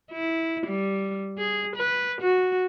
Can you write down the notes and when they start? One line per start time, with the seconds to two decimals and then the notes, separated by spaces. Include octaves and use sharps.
0.11 E4
0.66 G3
1.38 G#4
1.76 B4
2.21 F#4